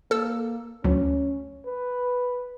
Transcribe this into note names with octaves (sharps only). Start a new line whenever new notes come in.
A#3 A4 E6
D2 F#3 C#4
B4